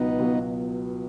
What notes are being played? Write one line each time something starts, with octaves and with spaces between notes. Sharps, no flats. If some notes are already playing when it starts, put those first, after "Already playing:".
Already playing: C#2 B2 F#3 B3 D#4
C#2 B2 F#3